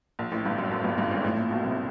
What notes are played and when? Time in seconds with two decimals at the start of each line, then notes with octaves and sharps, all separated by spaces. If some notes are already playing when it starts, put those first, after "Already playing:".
0.19 A#1 A#2
0.32 A1 A2
0.45 G1 G2
0.58 F#2
0.71 F#2
0.84 G1 G2
0.98 G1 G2
1.11 G#1 G#2
1.24 A1 A2
1.37 A#1 A#2
1.50 B1 B2
1.63 C2 C3